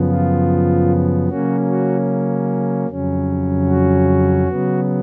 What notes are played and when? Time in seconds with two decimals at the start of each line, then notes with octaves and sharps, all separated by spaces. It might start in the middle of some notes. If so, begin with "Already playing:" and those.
Already playing: F#2 C#3 F3 B3
0.09 F4
1.28 C#3 F#3 A#3 C#4 F#4
1.69 F#4
2.88 F2 C#3 F#3 C#4
3.68 F#4
4.48 C#3 F#3 B3